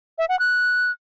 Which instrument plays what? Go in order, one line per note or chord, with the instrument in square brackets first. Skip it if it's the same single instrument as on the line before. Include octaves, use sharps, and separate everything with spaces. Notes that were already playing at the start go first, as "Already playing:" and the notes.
[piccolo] E5
F#5
F#6